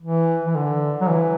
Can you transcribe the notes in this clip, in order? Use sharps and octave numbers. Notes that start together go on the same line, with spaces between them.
E3
E3
D3
F#3
E3